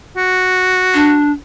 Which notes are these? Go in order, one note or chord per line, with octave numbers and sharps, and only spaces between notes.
F#4
D4